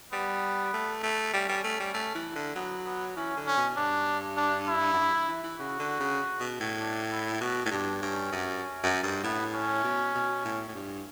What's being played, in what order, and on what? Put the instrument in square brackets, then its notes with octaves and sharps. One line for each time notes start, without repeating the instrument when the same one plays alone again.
[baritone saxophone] G3 [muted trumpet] B3
[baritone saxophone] A3
A3
[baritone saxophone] G3 [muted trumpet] C#4
[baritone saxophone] G3
A3
G3
A3
E3
D3
[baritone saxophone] F#3 [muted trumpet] B3
[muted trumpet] B3
[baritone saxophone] E3 [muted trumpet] C#4
[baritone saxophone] D3
[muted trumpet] C#4
[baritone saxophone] B2
[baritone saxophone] G2 [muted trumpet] D4
[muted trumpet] D4
E4
[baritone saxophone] F#2
G2
E3
E3
E3
[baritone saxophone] C#3 [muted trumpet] F#4
[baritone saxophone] D3
C#3
B2
A2
[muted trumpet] D4
E4
[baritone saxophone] B2 [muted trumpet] F#4
[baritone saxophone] A2
[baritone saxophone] G2 [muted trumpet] D4
[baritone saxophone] G2 [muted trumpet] C#4
[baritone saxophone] F#2
F#2
G2
[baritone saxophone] A2 [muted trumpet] B3
[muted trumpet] C#4
[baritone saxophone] B2
B2
A2
A2
G2